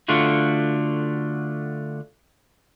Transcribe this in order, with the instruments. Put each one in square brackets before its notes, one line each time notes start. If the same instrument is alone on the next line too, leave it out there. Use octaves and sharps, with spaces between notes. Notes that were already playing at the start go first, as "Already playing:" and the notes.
[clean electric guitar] D3 A3 F4 F#4